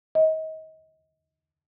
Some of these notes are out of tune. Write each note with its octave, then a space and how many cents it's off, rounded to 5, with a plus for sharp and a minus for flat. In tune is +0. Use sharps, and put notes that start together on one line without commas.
D#5 +30